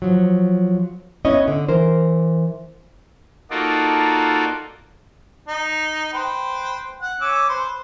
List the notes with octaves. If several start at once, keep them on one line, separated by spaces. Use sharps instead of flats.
F3 F#3
B3 C#4 E4 B4 C#5 D#5
D3
E3 A#4 C5
A#3 D#4 F4 F#4 A4 D5
D#4
B4 C5 G5
F#5
C#4 D6 E6
B4 C5